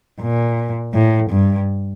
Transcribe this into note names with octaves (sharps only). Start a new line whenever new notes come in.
A#2
A2
G2